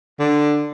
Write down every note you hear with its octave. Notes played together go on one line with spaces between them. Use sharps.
D3